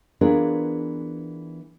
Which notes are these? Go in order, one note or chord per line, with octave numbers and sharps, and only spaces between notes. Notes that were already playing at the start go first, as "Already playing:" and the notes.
E3 B3 D4 F4 G#4 A#4